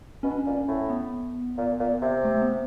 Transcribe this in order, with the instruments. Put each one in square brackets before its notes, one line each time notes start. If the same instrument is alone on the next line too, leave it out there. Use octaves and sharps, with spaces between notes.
[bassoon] B2 [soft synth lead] C#4
[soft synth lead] D4
C#4
[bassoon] A#2
[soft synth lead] C#4
[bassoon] A2
[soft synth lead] B3
[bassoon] A#2
A#2
C3
[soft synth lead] A3
B3